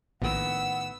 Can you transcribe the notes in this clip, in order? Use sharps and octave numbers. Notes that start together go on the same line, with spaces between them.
A#1 A2 D#3 B3 F#5 E6